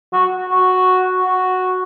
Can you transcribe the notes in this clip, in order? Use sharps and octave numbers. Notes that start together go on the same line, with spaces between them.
F#4
F#4
F#4